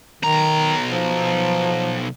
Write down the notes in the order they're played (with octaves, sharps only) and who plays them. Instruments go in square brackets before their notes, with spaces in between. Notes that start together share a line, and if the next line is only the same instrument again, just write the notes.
[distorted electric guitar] B1 A#5 [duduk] D#3
[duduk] F3